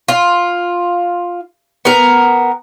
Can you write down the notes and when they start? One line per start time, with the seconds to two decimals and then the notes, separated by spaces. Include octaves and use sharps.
0.08 F4
1.85 B3 A#4